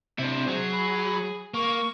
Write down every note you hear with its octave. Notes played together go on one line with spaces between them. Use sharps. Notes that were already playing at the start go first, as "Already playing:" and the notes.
C3 D4 E4 C5
F#3 G#4
B5
A#3 C#6